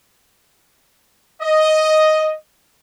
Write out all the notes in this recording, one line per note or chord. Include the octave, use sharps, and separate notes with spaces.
D#5